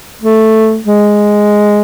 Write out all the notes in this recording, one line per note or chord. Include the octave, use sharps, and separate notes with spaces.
A3
G#3